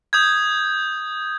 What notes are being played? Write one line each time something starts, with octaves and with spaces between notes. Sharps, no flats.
D#6 G6 G#6